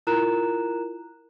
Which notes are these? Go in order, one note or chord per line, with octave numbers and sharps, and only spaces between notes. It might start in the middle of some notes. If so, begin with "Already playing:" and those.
E4 F4 A#4 A#5 F#6 E7